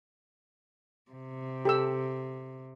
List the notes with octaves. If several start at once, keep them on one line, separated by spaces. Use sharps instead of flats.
C3
G4 A4 E6